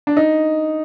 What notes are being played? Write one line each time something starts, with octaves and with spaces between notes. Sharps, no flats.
D4
D#4